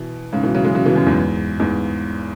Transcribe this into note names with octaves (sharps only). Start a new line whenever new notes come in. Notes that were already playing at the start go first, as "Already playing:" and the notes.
Already playing: B2 E3
G#2 C#3
B2 E3
C#3 F#3
E3 G#3
C#3 F#3
B2 E3
F#2 B2
E2 G#2
E2 G#2